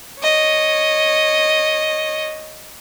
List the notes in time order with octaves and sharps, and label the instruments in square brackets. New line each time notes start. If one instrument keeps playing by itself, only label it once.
[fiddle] C#5 D#5